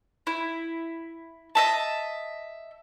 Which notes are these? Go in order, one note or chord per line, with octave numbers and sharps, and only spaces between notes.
E4
D#5 E5 A5